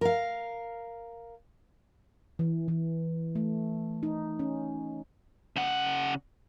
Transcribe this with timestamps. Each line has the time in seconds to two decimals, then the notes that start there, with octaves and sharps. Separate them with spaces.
0.01 A#4 F5
2.39 E3
2.68 E3
3.35 A3
4.03 D#4
4.39 C#4
5.56 C#3 F#5